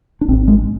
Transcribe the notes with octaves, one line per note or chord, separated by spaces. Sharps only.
D4
G#1 G#2 C4
G#3